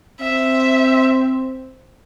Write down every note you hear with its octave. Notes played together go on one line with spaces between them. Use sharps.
C4 E5